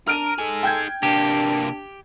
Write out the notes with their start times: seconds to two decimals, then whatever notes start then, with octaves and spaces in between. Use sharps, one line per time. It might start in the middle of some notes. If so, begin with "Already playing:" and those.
0.08 D4 A#4 F6 D7 D#7
0.39 D#4 G#4 A4
0.63 G5 G6 G#6
1.03 C3 A#3 D4 G4